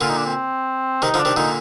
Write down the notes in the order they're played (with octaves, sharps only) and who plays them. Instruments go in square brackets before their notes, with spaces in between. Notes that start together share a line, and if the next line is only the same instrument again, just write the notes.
[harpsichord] A#2 D3 [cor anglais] F4
[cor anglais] D#4
D4
C4
[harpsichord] C3 D#3 [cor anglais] D#4
[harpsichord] D3 F3
[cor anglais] D4
[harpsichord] C3 D#3
[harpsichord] A#2 D3 [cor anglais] D#4